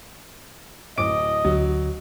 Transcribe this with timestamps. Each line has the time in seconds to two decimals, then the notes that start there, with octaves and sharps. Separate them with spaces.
0.98 D1 D#5 D6 D7
1.45 D2 F#3